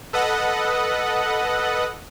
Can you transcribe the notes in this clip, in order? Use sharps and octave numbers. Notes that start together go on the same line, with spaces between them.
A4 B4 D#5 F#5